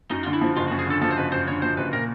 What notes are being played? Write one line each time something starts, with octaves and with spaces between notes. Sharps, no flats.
F#2 D#4
D3 F4
E4
F3
F#1 F4
F#4
F#2
G#4
D3 A4
F3 A4
C5
F#1 B4
F#2 C5
D3 C#5
F3 C5
F#1 B4
A#2 A#4